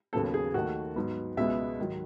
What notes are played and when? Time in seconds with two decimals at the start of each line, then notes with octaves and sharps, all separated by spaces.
0.13 D#2 C#3 F#3 B3 A4
0.34 G#4
0.54 D#2 D#3 A3 F#4
0.96 G#2 F#3 B3
1.37 C#2 B2 G#3 B3 E5
1.79 G#2 D#3 F#3